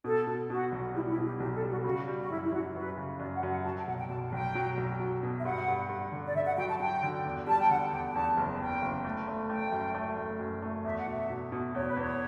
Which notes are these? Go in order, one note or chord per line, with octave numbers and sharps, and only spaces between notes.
B2 A4
B2
B2 F#4
B1
G3 E4
E4
B2
G4
B1 G4
A4
G3
F#4
C#3 F#4
G3
F#4
F#2 E4
E4
F#2 F#4
F#2 B4
C#3
F#2 D5
F#5
F#2
F#5
F#3 A5
G5
B1 F#5
G5
B1 A5
F#5
B1 G5
F#3
B1
F#3
B2
E5
G2 F#5
G2
G2
D3
D5
D3 E5
F#5
F#3 G5
A5
F#3 G5
D3
E2
G3 A5
G5
D3 F#5
E2 G5
G5
E2 A5
F#1
E2 G5
F#1
A3
A3
A3 G5
F#2
A3
A3
F#2
A3
E2 E5
F#5
B2 E5
B2
B2
E2 C#5
B4
E2 C#5